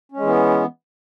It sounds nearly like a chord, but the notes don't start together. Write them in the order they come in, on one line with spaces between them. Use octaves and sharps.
C#4 G#3 E3 B3